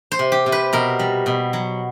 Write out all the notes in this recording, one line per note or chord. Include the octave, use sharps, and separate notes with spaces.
C5
C3
G4
C3
B4
B2 A#4
G3
B2
F#3